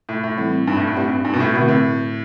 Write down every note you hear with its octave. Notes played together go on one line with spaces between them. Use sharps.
A2
A2
E3 G3 C4 E4 A4
G2
A2
G2
A2 C4 G4 B4 D5
G2
G2
B2
A2
B2 D3 A3 C4 F#4
A2